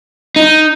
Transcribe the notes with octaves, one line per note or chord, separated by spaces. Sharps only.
D#4